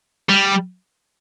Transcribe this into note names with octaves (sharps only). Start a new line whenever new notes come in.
G3